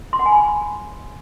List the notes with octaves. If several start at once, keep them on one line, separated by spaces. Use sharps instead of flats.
C6
F#5
G#5
B5